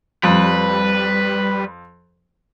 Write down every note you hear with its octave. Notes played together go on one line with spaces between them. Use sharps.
F2 G3 B4